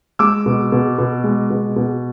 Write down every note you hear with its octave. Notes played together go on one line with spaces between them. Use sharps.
G#3 D6 E6
B2
B2
B2
G#3
B2
B2